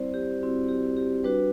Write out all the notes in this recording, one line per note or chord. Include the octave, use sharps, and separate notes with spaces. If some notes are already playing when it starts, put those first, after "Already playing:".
Already playing: G3 C4 E4 C5 D5
G4
G3 C4 E4 F#4
G4
G4
G3 D4 F#4 B4